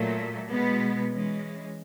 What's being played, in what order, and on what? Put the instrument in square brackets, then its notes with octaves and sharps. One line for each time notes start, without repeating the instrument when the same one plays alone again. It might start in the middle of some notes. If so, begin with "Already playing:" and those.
Already playing: [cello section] A#2 F#3 A3
B2 G#3 B3
E3 G#3 C#4